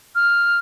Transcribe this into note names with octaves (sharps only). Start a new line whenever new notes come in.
F6